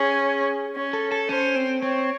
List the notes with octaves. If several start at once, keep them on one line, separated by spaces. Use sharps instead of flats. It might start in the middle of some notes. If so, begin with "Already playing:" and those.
Already playing: C#4 G#4
C#4
A4
A4
C#4 C5
C4
C4 C#5